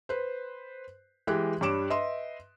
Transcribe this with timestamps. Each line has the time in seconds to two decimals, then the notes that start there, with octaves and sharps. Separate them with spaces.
0.09 B4 C5
1.27 E3 G#3 G4 F#6
1.61 G2 G3 C#5 D6 D7 E7
1.90 B4 D#5 E5 C6